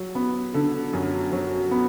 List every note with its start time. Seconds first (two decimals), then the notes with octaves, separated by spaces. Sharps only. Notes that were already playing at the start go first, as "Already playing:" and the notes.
Already playing: F#3
0.15 B3
0.54 D3
0.93 F#2
1.32 F#3
1.71 B3